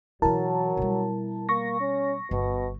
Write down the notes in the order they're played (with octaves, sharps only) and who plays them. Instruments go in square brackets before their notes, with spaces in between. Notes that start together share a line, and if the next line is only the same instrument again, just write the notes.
[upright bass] B2 E3 [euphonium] F#3 [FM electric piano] E4 A#4 A5
[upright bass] B2 G3
[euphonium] A#3 [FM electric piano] C#6 A#6
[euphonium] C#4
[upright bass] G1 [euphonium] B2